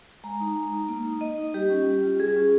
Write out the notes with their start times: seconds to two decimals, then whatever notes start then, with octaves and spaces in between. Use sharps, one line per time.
0.24 G#3 A#5
0.40 D#4
0.56 G#3
0.73 D#4
0.88 A#3
1.05 D#4
1.21 A#3 D#5
1.38 D#4
1.54 G3 G4
1.70 C#4 F4
1.86 G3
2.03 C#4 F4
2.19 G3 G#4
2.36 C#4 F4